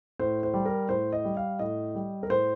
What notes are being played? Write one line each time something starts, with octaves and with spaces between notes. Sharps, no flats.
A2 C5
C5
G3
A#4
A2 C5
D#5
G3
F5
A2 D#5
G3
A#4
A2 C5